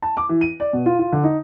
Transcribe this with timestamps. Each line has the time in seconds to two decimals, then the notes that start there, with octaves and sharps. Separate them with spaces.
0.02 A5
0.17 D6
0.29 E3
0.41 D#7
0.60 D5
0.73 B2
0.86 F4
0.99 F4
1.12 D3
1.24 D#4